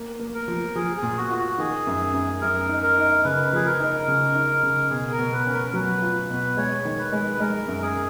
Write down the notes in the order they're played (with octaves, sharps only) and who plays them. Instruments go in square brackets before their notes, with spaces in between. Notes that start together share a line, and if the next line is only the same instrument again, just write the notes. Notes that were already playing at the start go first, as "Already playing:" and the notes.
Already playing: [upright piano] A#3
A#3
[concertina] A#4
[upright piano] F3
[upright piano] F3 [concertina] G#4
[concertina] G#4
[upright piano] A#2
[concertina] F#4
[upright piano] F4
[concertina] F#4
[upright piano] D#3 [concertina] G#4
[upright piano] F#2
F#2
[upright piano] F#2 [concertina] A#4
[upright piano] D#4
[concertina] A#4
[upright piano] D#4
[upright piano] C#3 [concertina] B4
[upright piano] F3 [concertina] G#4
[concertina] A#4
[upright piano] D#4
C#3
D#4
C#3
[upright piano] B2 [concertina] G#4
[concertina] A#4
[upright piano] B2
[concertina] B4
[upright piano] C#4
[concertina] A#4
A#4
[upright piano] F#3 [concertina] B4
[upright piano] F4
B2
[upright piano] G#3 [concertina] C#5
[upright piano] D#3
[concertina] B4
[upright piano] G#3
[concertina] B4
[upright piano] G#3 [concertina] A#4
[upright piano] F#2
[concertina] A#4
G#4